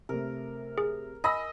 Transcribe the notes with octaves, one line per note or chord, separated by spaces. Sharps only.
C3 A3 A#4
G#4
D#5 G#5 B5 E6 A#6